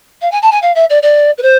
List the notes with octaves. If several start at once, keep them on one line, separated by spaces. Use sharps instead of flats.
F5
G#5
A5
G#5
F5
E5
D5
D5
B4
C5